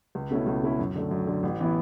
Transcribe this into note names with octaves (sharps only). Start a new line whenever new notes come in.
C#2
B2 A3 C#4 E4
C#2
B2 A3 C#4 E4
F#2
D3 A3
F#2
D3 A3
A1
E3 B3 E4